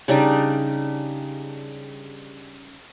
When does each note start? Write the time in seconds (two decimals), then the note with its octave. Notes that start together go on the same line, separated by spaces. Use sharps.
0.08 C#3 G3 D4 D#4